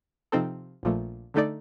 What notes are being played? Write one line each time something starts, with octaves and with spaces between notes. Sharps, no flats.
C3 F3 C4 D#4 A4
A#1 A#2 F3 A3
D3 A3 D#4 A4 D5